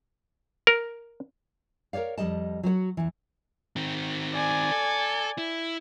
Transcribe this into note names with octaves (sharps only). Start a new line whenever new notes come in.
A#4
A#4 B4 C#5 D5 F5
F2 F3 G3 D#5 A5
F#3 F#4 C5 C#5
E2 E3
D#3 C4
D5 G#5
A4
E4